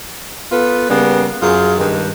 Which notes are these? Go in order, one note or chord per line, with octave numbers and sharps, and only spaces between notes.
B3 F4 A4 B4
C#3 G3 A#3 B3
F#2 F4 G#4
G2 D#3 G#3